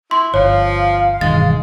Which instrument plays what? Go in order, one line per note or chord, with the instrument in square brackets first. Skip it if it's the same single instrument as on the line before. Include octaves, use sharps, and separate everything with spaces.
[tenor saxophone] E4 [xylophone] C6
[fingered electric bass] G1 [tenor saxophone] F3 [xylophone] C#5 [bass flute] F5
[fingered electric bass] E1 G2 D#3 [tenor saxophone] G#3 [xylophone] A6